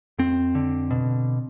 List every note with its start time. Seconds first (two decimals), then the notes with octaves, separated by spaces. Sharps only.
0.18 F2 C4
0.55 D3
0.91 B2